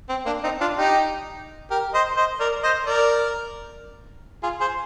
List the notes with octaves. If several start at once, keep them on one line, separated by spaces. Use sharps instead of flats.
C4
A#3 D4
C4 D#4
D4 F4
D#4 G4
G4 A#4
C5 D#5
C5 D#5
A#4 D5
C5 D#5
A#4 D5
F4 G#4
G#4 C5